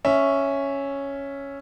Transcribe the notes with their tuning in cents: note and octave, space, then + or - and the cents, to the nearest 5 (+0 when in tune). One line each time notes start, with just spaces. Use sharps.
C#4 +0 E5 +0